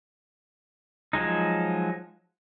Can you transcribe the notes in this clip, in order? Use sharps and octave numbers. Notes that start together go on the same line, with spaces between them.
F3 F#3 G#3 D#4